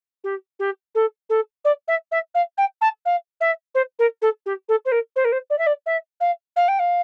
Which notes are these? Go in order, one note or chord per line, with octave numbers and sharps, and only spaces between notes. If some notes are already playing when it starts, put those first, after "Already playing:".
G4
G4
A4
A4
D5
E5
E5
F5
G5
A5
F5
E5
C5
A#4
A4
G4
A4
C5
A#4
C5
A#4
C5
D5
E5
D5
E5
F5
F5
G5
F5